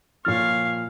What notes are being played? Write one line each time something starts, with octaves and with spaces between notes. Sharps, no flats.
A#2 F3 C#5 F5 F6 A6